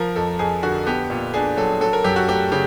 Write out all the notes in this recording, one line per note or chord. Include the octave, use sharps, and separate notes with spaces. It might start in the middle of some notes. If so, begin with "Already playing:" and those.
Already playing: F3 A#4
F2 A4
F2 G#4
D3 F#4
B3 G4
A#2
D4 G#4
F#3 A4
F#3 A4
A#4
F#2 G4
F#4
A3 G4
C#3 G4